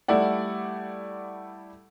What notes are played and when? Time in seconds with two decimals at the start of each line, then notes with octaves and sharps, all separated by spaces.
0.08 G3 A3 E4 D5 F#5